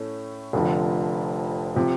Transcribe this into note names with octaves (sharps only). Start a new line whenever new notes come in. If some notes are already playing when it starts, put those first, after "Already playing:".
Already playing: A2 A3 C#4
F1 F2 D3 F3
C3 F3